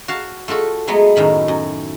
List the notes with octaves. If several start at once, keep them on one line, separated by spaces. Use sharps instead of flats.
F#4 F5 A5
A3 F4 F#4 A4
F#3 G#3 A3 B3 G#4
F#2 A2 D#3 B5
F#2